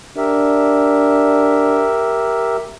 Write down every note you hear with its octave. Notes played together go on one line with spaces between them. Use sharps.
D4 G4 A#4 E5